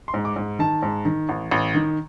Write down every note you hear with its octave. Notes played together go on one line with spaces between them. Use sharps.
C6
G#2
D6
G#2
D#3 A5
G#2
D#3
A1
A1
D#3